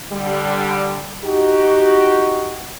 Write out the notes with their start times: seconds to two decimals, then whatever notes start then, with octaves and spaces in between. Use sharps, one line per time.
0.12 D3 G3
1.24 D#4 F#4 G4